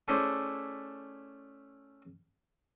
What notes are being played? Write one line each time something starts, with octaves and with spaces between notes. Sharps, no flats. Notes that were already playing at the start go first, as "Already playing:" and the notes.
A3 C#4 E4 G#4 C5 D5